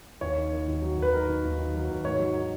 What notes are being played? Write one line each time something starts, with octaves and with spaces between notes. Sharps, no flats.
D#2 C#5
D#3
D#3
D#2
F#3
D#2
B4
D#3 A#4
D#2
D#2
D#3
F#3
D#2
G#2 C#5
F#3
D#3